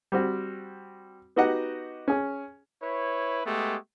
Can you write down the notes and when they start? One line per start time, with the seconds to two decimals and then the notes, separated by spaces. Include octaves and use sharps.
0.12 G3 C4 F#4
1.36 B3 D#4 F#4 G4 D#5 F#5
2.08 C#4 G#4
2.82 E4 B4 C#5
3.46 G#3 A3 B3 G4